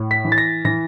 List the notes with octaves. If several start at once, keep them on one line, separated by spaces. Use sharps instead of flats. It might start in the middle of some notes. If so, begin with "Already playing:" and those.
Already playing: A2
B6
E3
A6
A#6
E3 A#6